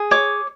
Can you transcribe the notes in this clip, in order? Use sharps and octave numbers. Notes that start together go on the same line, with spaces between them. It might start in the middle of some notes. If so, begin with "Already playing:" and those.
Already playing: G#4
C#5 D6